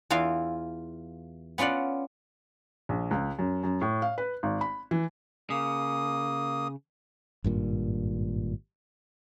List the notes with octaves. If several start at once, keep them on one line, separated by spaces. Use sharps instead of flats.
E2 E3 F4 F5
B3 C#4 F4 D5 F#5
A#1
C#2
F#2
F#2
A2
F5
B4
G#1
B5
E3
C#3 A#3 D#6
G#1 G2 A#2